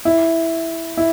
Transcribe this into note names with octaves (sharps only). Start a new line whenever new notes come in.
E4
E4